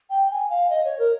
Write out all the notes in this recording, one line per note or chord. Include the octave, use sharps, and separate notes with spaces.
G5
G#5
F5
D#5
C#5
A#4